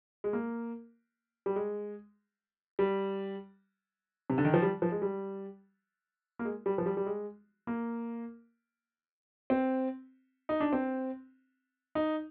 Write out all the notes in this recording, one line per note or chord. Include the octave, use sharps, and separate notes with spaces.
G#3
A#3
G3
G#3
G3
C3
D3
D#3
F3
G3
F3
G#3
G3
A#3
G#3
G3
F3
G3
G3
G#3
A#3
C4
D#4
D4
C4
D#4